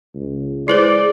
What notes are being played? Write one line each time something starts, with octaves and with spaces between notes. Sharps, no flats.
C#2
G#3 E4 G#4 B4 C5 D5